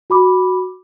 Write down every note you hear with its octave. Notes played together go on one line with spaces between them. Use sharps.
F#4 B5 D6